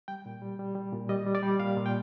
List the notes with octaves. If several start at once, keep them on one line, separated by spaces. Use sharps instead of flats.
G3 G5
A#2
G3
G3
G3
A#2
G3 D#5
G3
D5
G3
A#2 F5
A#2
G5